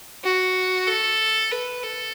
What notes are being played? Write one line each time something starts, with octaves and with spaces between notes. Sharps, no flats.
F#4
A4
B4
A4